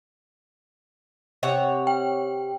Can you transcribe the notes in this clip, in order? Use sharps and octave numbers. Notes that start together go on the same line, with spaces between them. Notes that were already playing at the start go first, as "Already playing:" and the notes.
C3 C#5 F#5
G5